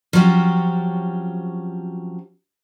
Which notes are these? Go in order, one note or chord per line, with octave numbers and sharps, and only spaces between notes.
F3 F#3 C4 C#4 F#4 G4